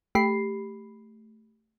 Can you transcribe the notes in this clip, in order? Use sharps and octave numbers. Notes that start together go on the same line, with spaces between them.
A3 G4 B5 C7